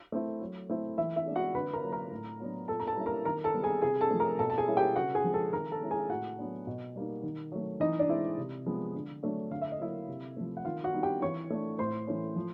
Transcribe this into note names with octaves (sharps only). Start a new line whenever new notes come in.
A3 C4 E4
F#3
A3 C4 E4
E3 E4 E5
E4 E5
G#3 B3 D4
F#4 F#5
D3 B4 B5
A#4 A#5
F#3 A#3 C#4
A#4 A#5
A2
F#3 B3 D4
A#2 A4 A5
A#5
A4 A5
G3 A#3 C#4 E4
A#4 A#5
D#3 A#4 A#5
A4 A5
G3 B3
G#4 G#5
C3 G#4 G#5
A4 A5
F3 A3
A#4 A#5
B2 A4 A5
A5
G#4 G#5
G3 A#3 C#4 E4
G4 G5
C#3 F#4 F#5
G#4 G#5
F3 G#3
A4 A5
D#3 A#4 A#5
A4 A5
G#3 C#4 E4
G#4 G#5
A2 F#4 F#5
F#3 B3 D4
B2
G3 A#3 D#4
D#3
F#3 A3
E3 D#4 D#5
D4 D5
G#3 C4 E4
C3
F3 G#3 B3
D3
F#3 A3 D4
D3 F5
E5
D#5
F#3 A#3 E4 E5
C3
F3 A3
F#5
D#3 F4 F5
F#4 F#5
G3 B3 D#4
G4 G5
E3 C#5 C#6
A3 D4
A2 C5 C6
E3 A3 C#4
F3